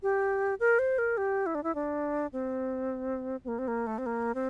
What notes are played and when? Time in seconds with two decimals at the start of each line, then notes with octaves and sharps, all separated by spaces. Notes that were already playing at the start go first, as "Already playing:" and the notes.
0.03 G4
0.60 A#4
0.79 C5
0.98 A#4
1.17 G4
1.46 E4
1.55 D4
1.64 E4
1.75 D4
2.33 C4
3.44 C4
3.48 A#3
3.59 C4
3.68 A#3
3.87 A3
3.98 C4
4.06 A#3
4.35 C4